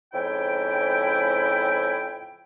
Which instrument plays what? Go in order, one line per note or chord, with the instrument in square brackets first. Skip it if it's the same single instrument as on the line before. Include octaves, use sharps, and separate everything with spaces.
[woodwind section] F2 G#2 C#3 E4 G5